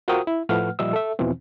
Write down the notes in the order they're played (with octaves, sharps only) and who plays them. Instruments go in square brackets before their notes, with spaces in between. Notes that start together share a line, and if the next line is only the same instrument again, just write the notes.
[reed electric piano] F4 F#4 A#4 C5 G5 D#6
E4
A2 F3 A3 B4 F#5 F6
A#2 F3 G3 D#5 E5 E6
A4 E5
E2 B2 E3 F3 C4